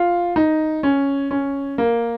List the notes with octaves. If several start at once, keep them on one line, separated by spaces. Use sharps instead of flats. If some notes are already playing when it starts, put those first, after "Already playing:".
Already playing: F4
D#4
C#4
C#4
A#3